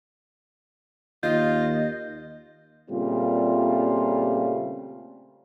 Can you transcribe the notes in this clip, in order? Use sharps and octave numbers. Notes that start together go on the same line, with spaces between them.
D#2 F4 D#5 G6
A#2 C#3 G3 A3 C4 F4